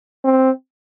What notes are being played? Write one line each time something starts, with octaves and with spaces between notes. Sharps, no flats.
C4